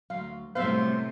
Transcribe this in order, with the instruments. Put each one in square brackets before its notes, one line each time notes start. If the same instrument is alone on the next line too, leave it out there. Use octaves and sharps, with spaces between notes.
[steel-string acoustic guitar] D2 F#3 [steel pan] F5
[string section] A2 C3 [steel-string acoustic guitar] F#3 G3 B3 [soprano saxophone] C5 [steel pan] E5 F5